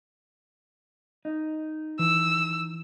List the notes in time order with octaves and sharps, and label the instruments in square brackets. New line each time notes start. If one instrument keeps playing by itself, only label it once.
[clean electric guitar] D#4
[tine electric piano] E3 [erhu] E6